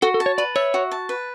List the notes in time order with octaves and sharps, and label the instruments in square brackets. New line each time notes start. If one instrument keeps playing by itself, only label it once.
[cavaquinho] F#4 [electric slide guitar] A4
[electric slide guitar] A4
[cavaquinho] A5
[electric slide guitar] C#5
[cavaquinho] B4 [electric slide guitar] D5
[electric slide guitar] C#5 [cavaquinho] E5
[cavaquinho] F#4
A5
B4